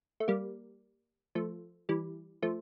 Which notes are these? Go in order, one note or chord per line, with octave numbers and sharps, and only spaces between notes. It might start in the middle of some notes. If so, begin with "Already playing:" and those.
A3
G3 A#3
F3 A3
E3 G3
F3 A3